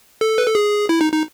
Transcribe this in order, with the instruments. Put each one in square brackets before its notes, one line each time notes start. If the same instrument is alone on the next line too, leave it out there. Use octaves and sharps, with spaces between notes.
[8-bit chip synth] A4
B4
A4
G#4
E4
D#4
D#4